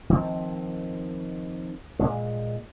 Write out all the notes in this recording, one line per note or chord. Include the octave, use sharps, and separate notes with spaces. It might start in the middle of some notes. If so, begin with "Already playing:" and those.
D#3 F3 C4
A#2 G#3